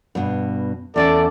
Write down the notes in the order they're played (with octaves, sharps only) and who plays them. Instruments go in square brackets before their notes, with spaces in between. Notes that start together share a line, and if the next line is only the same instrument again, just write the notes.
[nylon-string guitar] G2 B2
[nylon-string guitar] E2 C#4 E5 [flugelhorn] A4 [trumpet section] D5